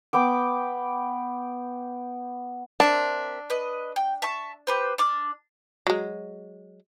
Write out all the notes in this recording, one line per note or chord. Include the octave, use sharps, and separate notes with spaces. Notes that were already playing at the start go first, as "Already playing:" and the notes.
B3 G5 D6
C4 D4 A#4 E5
B4 D#5
G5
E5 A5 C#6
G4 B4 C5
D4 D6 F6
F#3 G#3